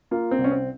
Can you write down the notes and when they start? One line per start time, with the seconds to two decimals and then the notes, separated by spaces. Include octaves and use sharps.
0.11 A#3 F4
0.31 C4
0.38 C2
0.44 C#4
0.51 C4